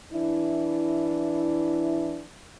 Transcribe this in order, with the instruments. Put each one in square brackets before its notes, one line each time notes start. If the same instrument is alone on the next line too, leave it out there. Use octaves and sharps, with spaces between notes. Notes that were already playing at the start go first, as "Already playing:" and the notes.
[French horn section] E3 D4 E4